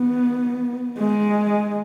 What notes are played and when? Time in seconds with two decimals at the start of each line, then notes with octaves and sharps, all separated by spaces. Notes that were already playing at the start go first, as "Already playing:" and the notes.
Already playing: B3
0.99 G#3